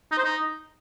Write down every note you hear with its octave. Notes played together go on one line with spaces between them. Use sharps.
D#4
C5
D#4